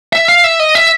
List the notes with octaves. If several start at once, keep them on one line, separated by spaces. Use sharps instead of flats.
E5
F5
E5
D#5
E5